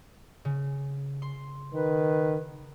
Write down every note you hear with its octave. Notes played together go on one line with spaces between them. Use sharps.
C#3
C6
D#3 B4